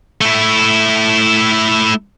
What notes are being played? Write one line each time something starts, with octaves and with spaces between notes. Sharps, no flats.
A3 E4